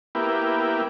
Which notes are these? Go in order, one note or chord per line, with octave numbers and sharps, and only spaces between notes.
A#3 B3 E4 G4